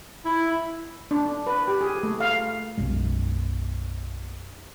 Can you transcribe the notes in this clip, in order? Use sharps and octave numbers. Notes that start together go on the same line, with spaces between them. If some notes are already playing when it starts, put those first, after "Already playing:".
E4
D4
B4
G4
G#4
A3
F5
B1 F#2 G#3